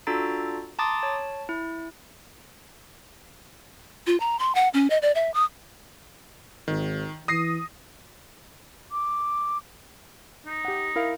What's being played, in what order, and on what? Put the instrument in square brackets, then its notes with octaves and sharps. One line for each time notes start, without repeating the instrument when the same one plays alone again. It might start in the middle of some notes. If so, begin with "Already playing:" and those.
[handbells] D4 F4 F#4 A4 A#5 A6
A5 A#5 C6 D6 D#6 A6
C#5 A5
E4
[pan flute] F4
A#5
C6
F#5
C#4
D#5
D5
E5
D#6
[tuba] G#1 [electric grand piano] D#3
[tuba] E3 [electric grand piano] D#6 A#6 C7
[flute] D6
[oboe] D#4
[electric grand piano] G4 F#5
E4 A#4 F5